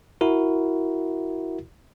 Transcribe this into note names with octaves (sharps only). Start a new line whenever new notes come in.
E4 F#4 A#4